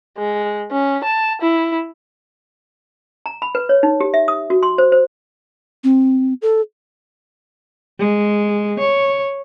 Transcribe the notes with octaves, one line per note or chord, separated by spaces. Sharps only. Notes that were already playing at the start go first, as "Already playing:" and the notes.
G#3
C#4
A5
E4
A#5
B5
B4
C#5
D#4
G4
E5
D#6
F#4
C6
C5
C5
C4
A4
G#3
C#5